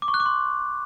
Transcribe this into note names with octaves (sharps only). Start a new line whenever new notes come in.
D6
C#6
F#6
D6
C6